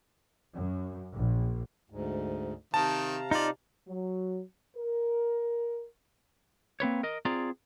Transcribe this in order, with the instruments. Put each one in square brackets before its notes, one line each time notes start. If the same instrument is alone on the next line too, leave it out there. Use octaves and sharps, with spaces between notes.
[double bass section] F#2
A#1
[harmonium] D2 G#2
[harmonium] C3 F5 A#5 [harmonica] D#3 C4 [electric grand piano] A5
[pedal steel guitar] D#4 D5 [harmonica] F4
[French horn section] F#3
A#4
[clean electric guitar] A#3 C4 B4 C#5
A#4 D#5
C4 F4 G#4 D5 A#5